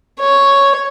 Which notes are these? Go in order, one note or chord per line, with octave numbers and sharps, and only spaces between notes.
C#5